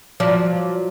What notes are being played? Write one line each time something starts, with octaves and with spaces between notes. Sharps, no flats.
F3 F#3 D5